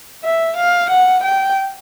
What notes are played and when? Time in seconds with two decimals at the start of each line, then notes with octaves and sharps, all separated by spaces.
0.24 E5
0.57 F5
0.90 F#5
1.23 G5